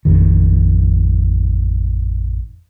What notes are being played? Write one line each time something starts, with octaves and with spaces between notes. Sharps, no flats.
A1 F2 D#3